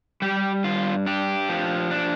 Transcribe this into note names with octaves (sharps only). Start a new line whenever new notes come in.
G3 G4
G2 F4
D4 G4
F3
D4